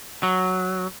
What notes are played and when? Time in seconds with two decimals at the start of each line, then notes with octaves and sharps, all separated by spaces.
0.23 F#3